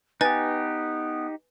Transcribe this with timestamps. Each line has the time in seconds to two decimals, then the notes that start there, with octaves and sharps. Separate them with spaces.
0.21 B3 D#4 G4 B4 G#5 A6